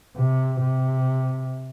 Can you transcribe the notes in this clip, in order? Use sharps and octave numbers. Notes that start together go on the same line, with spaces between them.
C3
C3